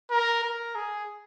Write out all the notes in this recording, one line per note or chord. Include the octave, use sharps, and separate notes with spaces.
A#4
A#4
G#4